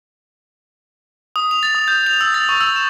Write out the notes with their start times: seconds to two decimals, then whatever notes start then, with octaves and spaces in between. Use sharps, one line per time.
1.36 D#6
1.51 F7
1.63 A6
1.75 D#6
1.88 G6
2.07 F7
2.21 E6
2.34 A6
2.49 C#6
2.61 E6
2.76 E7